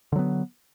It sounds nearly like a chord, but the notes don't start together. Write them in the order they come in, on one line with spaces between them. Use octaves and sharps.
D3 F#3 B3